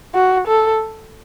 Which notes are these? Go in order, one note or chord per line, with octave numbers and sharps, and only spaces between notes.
F#4
A4